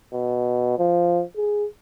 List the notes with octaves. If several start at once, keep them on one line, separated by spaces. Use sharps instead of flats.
B2
F3
G#4